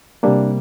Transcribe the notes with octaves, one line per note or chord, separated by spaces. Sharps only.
C3 G3 A#3 D4